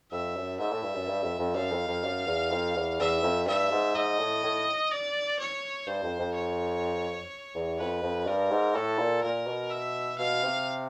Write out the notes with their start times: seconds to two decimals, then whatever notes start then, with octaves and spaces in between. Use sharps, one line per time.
0.12 F2 E5
0.36 F#2
0.60 G#2 E5
0.72 A2
0.83 G2
0.95 F#2
1.08 G2
1.23 F2
1.39 F2
1.56 F#2 F5
1.72 F2
1.88 F2
2.04 F#2
2.27 E2
2.51 F2
2.76 E2
3.00 E2 E5
3.23 F2
3.47 G2 E5
3.71 G#2
3.95 G#2 D#5
4.20 A2
4.44 A2
4.91 D5
5.39 C#5
5.87 G2 C5
6.03 F2
6.20 F2
6.35 C#5
7.55 E2
7.79 F2 B4
8.02 F2
8.27 G2 A#4
8.51 G#2
8.75 A2 A4
8.99 A#2
9.23 A#2 A#4
9.47 B2
9.71 E5
10.19 B2 F5
10.43 C3